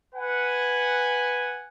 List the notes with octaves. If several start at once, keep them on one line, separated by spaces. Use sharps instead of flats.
B4 F#5 G#5